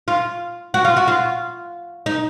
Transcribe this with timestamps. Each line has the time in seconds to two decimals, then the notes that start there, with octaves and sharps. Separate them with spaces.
0.08 F4
0.74 F#4
0.85 F4
0.97 F#4
1.08 F4
2.06 D#4